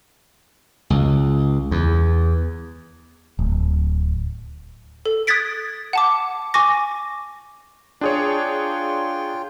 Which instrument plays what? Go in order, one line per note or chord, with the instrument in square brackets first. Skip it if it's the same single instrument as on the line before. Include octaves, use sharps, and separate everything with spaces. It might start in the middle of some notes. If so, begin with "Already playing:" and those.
[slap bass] C#2
E2
[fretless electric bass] D1
[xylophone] A4
D#6 F#6 G#6 A6 B6 D7
F#5 A5 D6
G#5 C#6 D6 A#6
[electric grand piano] D4 G#4 C#5 [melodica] F4 G5